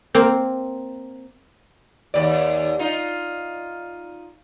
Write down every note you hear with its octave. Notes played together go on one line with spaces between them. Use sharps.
A#3 C4
D#2 D5
D#4 F4